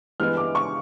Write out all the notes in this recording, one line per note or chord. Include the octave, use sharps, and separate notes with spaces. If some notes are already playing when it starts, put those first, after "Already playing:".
G2 E3 G#3 B3 F6
D6
C#6